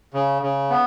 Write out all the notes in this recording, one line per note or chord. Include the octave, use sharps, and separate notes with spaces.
C#3
C#3
B3